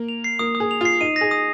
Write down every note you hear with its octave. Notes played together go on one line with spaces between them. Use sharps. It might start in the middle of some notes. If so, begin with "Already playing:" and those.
Already playing: A#3
F7
C7
A#3 D#6
D#6
G#4
F7
F4 C7
D#4 D#7
G#4 A#6
D#6